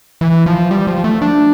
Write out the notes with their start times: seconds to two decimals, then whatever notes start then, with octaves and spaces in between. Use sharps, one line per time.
0.21 E3
0.46 F3
0.71 G3
0.87 F3
1.04 A3
1.22 D4